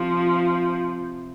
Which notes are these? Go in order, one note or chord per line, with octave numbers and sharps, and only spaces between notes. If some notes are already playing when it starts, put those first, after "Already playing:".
Already playing: C3 F3